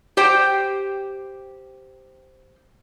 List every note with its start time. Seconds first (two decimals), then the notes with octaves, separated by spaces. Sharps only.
0.17 G4 C5 G5